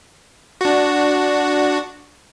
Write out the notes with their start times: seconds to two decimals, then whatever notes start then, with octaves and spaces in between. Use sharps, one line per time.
0.61 D4 F#4